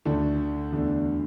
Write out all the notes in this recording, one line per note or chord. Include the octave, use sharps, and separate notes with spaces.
D2 D3 A3 D4 A4
E2 D3 A3 D4